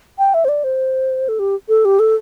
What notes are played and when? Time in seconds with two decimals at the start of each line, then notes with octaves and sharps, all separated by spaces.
0.18 G5
0.34 E5
0.45 C5
0.49 D5
0.64 C5
1.28 A4
1.39 G4
1.69 A4
1.85 G4
1.99 A4